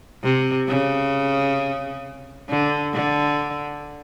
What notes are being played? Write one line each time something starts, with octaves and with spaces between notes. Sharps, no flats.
C3
C#3
D3
D3